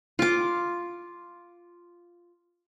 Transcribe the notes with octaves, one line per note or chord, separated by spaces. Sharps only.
F4 D6